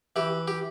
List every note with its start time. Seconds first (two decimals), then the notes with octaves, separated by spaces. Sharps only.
0.16 E3 G4
0.48 G4